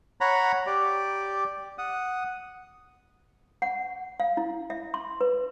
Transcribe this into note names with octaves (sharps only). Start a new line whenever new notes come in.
C#5 F#5 A#5 B5
G4 D5
F#5 D#6
F#5
F5
E4
E5
C6
B4